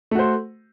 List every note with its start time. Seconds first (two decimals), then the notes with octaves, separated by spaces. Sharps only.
0.11 A3
0.15 F#4
0.19 C5